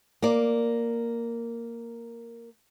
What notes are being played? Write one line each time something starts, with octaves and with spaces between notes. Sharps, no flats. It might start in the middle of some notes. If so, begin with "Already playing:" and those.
A#3 A#4 D5